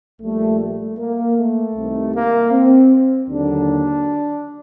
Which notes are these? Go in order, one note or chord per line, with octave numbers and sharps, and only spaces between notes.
A#1 A#2 G3 A3
A3
A#3
A3
C2 C3 D#3
A#3
C4
D#2 D3 F#3 D4